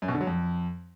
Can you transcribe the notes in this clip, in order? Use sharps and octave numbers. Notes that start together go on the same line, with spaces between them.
F#2
B2
D3
F#3
F2